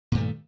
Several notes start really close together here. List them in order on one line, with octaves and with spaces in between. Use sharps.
A#2 G2 A3 D#3